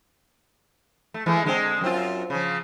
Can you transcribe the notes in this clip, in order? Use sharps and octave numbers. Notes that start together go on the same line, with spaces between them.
A3
E3 G#3 A3
D3 G#3 C4
F#2 C4 F4
C#3 F3